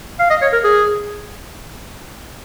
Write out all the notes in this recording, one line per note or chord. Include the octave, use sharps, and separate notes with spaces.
F5
D#5
C#5
A#4
G#4